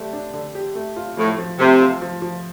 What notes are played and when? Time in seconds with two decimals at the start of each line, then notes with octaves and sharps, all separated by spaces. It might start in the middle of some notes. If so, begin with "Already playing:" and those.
Already playing: D3 A3 G4
0.13 D4
0.34 D3
0.55 G4
0.75 A3
0.96 F4
1.17 A2 F3
1.38 F3
1.59 C3 A3
1.80 F4
2.02 F3
2.22 F3